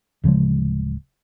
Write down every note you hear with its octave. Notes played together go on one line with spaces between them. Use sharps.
D1 C#3 F3 G#3